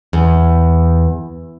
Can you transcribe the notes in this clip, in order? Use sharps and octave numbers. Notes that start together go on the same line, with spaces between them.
E2